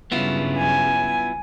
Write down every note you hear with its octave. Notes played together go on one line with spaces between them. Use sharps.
G2 C#3 F#3 B3 E4 F4
G#5